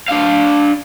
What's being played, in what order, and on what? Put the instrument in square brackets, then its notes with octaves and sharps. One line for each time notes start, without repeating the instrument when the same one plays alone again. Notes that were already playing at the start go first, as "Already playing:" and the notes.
[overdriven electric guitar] D4 F5